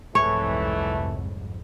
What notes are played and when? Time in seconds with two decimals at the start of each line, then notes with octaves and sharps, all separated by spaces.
0.15 C2 F2 G#2 E3 A3 C#5